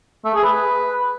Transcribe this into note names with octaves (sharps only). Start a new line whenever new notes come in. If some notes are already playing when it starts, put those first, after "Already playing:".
A3
G#4
B4